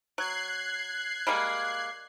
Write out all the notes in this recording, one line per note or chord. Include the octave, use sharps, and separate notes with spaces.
F#3 F#6 G#6 C7
G3 G#3 A#3